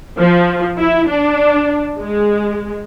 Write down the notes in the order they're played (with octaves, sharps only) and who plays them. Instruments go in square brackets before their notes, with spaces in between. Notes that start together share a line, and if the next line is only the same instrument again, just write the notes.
[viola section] F3
E4
D4
G#3